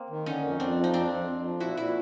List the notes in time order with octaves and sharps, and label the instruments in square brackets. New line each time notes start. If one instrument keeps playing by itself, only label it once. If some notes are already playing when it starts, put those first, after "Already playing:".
Already playing: [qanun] A#3 C4
[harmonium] D#3
[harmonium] D3 [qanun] C#4 D#4
[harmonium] F2
[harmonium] F2 [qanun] C4 D4
[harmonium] F3
[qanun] D#4
[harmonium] F2 [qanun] C4 D4
[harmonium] F2
F2
F3
[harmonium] A#2 [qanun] E4 F#4
[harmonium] A#2 [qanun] E4 F#4